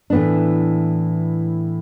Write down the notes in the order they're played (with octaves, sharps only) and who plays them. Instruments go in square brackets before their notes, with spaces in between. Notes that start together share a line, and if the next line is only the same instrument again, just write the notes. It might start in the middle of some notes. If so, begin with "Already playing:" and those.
[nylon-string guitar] A2 E3 B3 D4